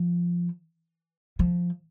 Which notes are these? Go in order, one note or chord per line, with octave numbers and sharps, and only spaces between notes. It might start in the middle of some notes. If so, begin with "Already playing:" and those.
Already playing: F3
F3